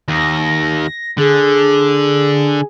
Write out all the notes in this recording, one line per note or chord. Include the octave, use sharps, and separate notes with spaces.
D#2 A#6
D3 G#4